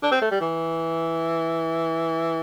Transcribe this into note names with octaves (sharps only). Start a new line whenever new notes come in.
D4
C4
A3
G3
E3